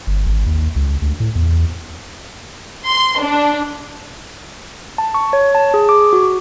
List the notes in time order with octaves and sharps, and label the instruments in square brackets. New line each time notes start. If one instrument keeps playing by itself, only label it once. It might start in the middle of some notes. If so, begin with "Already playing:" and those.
[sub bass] G1
G#1
D#2
C#2
D2
A2
E2
[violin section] C6
D4
[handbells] A5
C#6
C#5
A5
G#4
D6
F#4